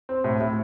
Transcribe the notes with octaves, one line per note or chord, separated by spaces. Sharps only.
C4
A2
A2